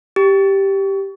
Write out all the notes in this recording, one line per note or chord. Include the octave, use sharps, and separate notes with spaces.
G4